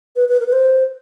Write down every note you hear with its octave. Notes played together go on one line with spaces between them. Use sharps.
B4
B4
A#4
B4
C5